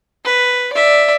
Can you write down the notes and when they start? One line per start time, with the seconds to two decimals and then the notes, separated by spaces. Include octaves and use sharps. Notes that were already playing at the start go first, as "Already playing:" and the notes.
0.25 B4
0.73 D5 E5